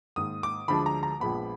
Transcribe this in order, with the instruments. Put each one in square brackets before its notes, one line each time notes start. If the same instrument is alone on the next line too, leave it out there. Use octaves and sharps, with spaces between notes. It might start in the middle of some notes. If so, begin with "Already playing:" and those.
[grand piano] G#2 D#3 A#3 D#6
D6
D2 D3 F3 G#3 D4 B5
A#5
A#5
A#1 A#2 F3 G#3 B3 B5